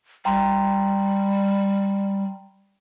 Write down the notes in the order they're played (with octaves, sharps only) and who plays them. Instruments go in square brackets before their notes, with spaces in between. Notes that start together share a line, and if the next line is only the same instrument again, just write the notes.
[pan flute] G3 [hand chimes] G5 A#5 C6